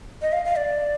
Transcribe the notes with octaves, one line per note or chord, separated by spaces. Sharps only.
D#5
F5
F5
D5